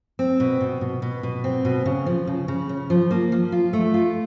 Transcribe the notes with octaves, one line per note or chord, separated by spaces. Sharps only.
C4
B2
B2
B2
B2
B2
C4
B2
C#3
F3
C#3
C#3
C#3
F3
A#3
F3
F4
A3
F4